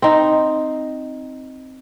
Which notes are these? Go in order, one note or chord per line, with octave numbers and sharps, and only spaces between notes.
C4 D#4